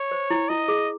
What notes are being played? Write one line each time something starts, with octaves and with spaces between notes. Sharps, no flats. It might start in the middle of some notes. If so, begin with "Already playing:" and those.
Already playing: C#5
C5
E4
E4 D#5
G#4